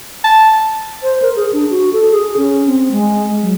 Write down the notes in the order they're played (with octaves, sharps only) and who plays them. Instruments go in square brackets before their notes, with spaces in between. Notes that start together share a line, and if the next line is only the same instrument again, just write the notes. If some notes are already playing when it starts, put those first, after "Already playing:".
[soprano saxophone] A5
[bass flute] C5
A#4
G#4
D4
F#4
A4
G#4
C#4
C4
G#3
F#3